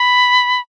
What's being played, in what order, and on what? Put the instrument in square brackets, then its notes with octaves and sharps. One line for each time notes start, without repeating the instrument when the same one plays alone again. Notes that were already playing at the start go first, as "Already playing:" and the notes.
Already playing: [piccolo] B5